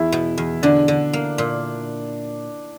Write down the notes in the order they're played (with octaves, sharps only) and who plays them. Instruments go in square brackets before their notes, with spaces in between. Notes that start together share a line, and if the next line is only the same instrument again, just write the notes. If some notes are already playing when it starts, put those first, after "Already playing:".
Already playing: [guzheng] E2 [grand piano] E4
[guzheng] B2
E2
[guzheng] D3 [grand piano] D4
[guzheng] D3
A#3
A#2